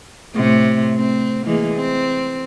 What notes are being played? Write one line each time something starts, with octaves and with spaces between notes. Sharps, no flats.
A2 C3 A3
C4
E3 G#3 A#3
C4